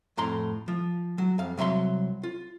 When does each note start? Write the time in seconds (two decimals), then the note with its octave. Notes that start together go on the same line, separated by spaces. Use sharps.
0.17 F2 A2 A#5 C6
0.68 F3
1.18 F#3
1.38 F2 F5
1.57 C2 F#3 E5 B5 C6
2.23 F4